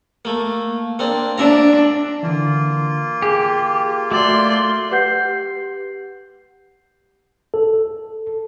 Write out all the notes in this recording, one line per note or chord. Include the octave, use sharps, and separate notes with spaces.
A3 A#3
A#3 C4 D4
D4 E5 A#5
D3 E3 A#3 F4
G4 G#4
A3 F#4 D5 C6
G4 B4 F#5 G6 C7
A4